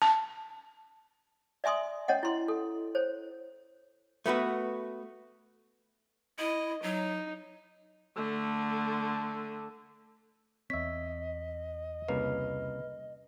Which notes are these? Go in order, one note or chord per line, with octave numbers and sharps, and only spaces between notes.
A5
D5 E5 G#5 C6 D#6
C#4 C#5 D#5 F#5
E4 C6
A4
C5 C#5
A3 B3 F#4 B4
E4 D#5
F#3 D#4
D3 A3
E2 C4 C#5 D#5 E5 B6
C2 C#3 A#3 B4